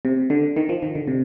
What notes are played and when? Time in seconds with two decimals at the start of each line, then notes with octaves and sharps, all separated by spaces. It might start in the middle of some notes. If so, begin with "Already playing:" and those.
0.05 C3
0.30 D3
0.57 D#3
0.69 F3
0.82 D#3
0.95 D3
1.07 C3